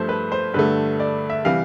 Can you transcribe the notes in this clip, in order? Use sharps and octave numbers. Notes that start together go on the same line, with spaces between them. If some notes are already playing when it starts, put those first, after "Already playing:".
Already playing: G2 F3 A3 C5
B4
C5
G2 D3 A3 B4
D5
E5
C3 E3 G3 F5